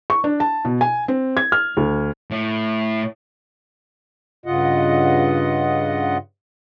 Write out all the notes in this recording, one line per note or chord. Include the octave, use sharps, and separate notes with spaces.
C#6
D4
A5
B2
G#5
C4
G#6
F6
D2
A2
G2 C#3 F4 D#5 F#5